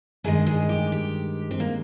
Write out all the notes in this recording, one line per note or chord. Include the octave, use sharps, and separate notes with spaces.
G2 D#3 G#3 G#4
G#4
G4
G4
C4
A#3